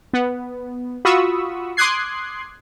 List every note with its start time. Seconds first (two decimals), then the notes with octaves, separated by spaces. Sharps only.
0.13 B3
1.05 F4 F#4 B5 C#6 D#6 E6
1.77 C6 D6 D#6 F#6 G#6 C7